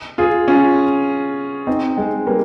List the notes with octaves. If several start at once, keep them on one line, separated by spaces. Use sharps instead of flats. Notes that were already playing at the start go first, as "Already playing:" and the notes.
F4 G#4
C#4 F4
C4 D#4
G#3 C4
G3 A#3